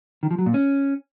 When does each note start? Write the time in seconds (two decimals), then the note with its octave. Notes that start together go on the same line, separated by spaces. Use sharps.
0.23 D#3
0.31 F3
0.38 F#3
0.46 A#2
0.54 C#4